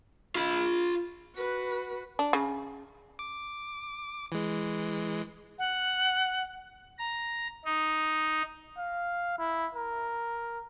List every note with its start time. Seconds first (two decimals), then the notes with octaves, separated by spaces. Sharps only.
0.35 F4 B5
1.35 F#4 B4
2.19 D4
2.33 C#3
3.19 D6
4.32 E3 G#3
5.59 F#5
6.99 A#5
7.65 D#4
8.78 F5
9.38 E4
9.75 A#4